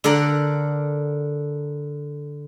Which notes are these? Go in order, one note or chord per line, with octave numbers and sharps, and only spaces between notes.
D3 A4 A#4 D5 F#5